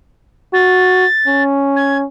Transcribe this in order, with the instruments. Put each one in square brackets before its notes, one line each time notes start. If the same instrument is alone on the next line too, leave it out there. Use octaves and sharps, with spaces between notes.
[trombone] F#4 [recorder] A6
[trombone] C#4
[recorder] G#6